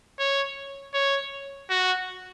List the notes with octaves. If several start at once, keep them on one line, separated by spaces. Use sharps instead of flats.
C#5
C#5
F#4